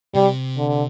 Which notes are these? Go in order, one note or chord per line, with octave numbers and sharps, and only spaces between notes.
C3 G3
D3